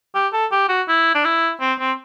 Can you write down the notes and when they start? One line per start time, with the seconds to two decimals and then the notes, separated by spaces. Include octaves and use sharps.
0.15 G4
0.33 A4
0.52 G4
0.69 F#4
0.88 E4
1.15 D4
1.25 E4
1.61 C4
1.79 C4